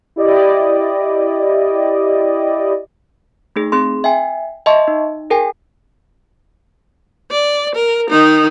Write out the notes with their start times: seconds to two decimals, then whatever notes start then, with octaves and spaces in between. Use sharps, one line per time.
0.16 E4 G4 D5 D#5
3.56 A3 D#4 G#4
3.72 C4 G#4 C6
4.04 E5 G5 G#5
4.66 D#5 E5 A5 C6 C#6
4.88 D#4
5.30 G#4 A#4 G5 G#5
7.31 D5
7.75 A#4
8.10 D#3 D#4